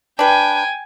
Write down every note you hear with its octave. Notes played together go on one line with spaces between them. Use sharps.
D4 B4 G5 G#5